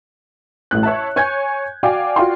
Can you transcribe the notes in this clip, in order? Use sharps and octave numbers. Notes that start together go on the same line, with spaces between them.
A1 A2 F#6
C#5 E5 A5
C#5 G#5 G6 G#6
F#4 D5 F5 G5 G#5 D6
F4 F#4 D5 G5 C6